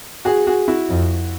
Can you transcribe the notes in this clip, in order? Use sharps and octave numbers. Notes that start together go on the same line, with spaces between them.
F#4 G#4
F#4 G#4
E4 F#4
F2